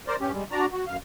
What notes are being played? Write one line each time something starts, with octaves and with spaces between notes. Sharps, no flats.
A#4 C5 D5
G2 C#4 G4
G3 G#3
D4 F#4 D5 A#5
F#4
F#2 F5